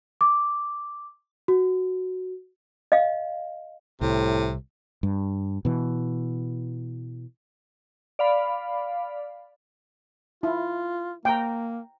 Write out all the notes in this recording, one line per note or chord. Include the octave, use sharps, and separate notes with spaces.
D6
F#4
D#5 F5
C2 A2 C3
G2
B2 E3
D5 F5 B5
E4 F4
A#3 G5 A#5